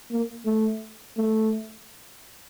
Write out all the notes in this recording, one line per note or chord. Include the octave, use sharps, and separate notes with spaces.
A#3
A3
A3